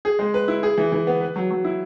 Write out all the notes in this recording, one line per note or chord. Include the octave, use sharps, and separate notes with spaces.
G#4
G#3
B4
E4
G#4
E3
E3
B3
B4
F#3
F#3
E4